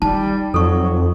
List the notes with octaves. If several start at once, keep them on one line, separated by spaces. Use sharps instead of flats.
G3 D#4 A5
F2 F#3 A4 C#6